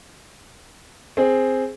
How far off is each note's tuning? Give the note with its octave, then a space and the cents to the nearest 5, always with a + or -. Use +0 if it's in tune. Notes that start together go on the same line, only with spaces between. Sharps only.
C4 +0 G#4 +0